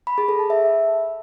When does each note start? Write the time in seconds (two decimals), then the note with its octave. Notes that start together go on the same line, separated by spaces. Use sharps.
0.07 B5
0.18 G#4
0.28 A4
0.39 A5
0.50 E5